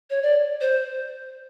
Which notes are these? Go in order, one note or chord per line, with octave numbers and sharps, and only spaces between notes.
C#5
D5
C5